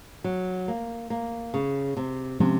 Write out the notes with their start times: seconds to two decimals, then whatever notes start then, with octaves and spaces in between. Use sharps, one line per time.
0.24 F#3
0.68 A#3
1.10 A#3
1.54 C#3
1.97 C3
2.40 C3 F3 G#3 C#4